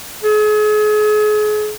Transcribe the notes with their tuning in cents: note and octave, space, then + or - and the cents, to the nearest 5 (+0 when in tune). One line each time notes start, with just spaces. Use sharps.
G#4 +35